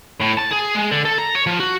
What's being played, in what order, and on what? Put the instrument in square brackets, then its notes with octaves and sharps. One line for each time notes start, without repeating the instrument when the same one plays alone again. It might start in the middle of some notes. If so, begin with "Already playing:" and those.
[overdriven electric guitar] A2
A5
G#4
G#3
D3
A4
A#5
C#5
F3
F#4